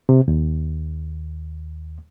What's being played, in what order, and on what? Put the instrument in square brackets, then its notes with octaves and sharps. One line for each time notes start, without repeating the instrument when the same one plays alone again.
[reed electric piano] C3
D#2